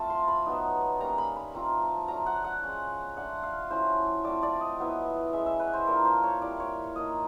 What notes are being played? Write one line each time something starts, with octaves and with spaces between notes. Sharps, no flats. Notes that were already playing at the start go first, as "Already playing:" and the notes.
Already playing: A3 C4 F4 A5
C6
B5
F#3 B3 D#4
G3 A#3 C#4 A#5
B5
B5
A3 C4 F4 A#5
A5
F#3 A3 D4 A#5
F#5
F#5
G#3 C#4 F4
A3 D4 F4 F#5
F5
F#3 A3 C#4 E4 C5
A3 C4 F4 D5
D5
D#5
F#3 B3 E4
G#3 C#4 E4 E5
E5
B4
C5
A#3 D4 F4 A#4
C5
C#5
G3 C4 E4 D5
C#5
F3 A#3 D#4 D#5